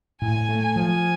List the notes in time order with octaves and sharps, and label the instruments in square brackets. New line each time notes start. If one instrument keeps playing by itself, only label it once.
[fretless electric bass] A2 [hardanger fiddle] G#5
[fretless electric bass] A3
[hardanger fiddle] G#5
[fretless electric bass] F3